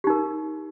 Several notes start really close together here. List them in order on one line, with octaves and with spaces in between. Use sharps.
G4 D#4 A#4